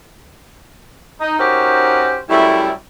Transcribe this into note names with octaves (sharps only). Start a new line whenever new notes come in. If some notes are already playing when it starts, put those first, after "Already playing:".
D#4
C#4 D#4 F#4 G4 A#4 C5
F#2 G3 A3 E4